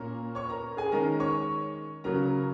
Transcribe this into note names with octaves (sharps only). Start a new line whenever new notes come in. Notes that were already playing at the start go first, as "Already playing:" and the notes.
Already playing: A#2 A#3 C#4 A#4 A#5
C#5 C#6
A#4 A#5
G#4 G#5
D#3 G#3 C#4 A#4 A#5
C#5 C#6
C#3 F#3 C#4 A#4 A#5